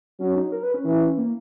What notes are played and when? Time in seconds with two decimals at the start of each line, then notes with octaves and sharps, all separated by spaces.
0.20 F#3 C#4
0.35 D#4
0.52 A#4
0.63 B4
0.74 C#4
0.85 E3
1.17 A#3